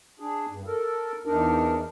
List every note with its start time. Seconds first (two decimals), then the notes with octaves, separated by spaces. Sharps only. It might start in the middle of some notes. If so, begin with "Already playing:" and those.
0.20 D4 G#4
0.49 G2
0.67 A4 A#4
1.25 E2 D4 D#4 A#4